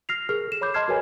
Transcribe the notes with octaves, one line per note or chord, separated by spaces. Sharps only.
F6 A#6 C7 F7
G#4 A#4 F6
A4 E7
C#5 B5 D6 G6
D#5 A5 C6 F6 G#6 C7
F#4 G#4 A#4 B4 C#5 G#5